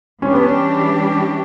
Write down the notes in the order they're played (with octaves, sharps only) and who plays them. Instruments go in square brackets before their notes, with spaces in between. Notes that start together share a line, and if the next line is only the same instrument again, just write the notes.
[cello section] E3 G3 D4 G4 [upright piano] C#4
[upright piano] B3
C#4